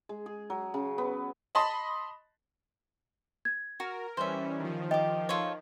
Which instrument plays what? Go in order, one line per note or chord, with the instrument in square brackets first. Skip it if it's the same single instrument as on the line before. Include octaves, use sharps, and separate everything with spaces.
[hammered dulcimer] G#3
G#4
F#3
C#3
B3
[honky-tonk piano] D#5 A5 B5 C6 D#6
[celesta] G#6
[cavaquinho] F#4 [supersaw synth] A#4
[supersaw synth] E3 G3 C#4 [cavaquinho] C5 E5
[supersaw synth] D#3 F3
[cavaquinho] G4 D6 [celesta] D#5
[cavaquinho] F4 A4 C#5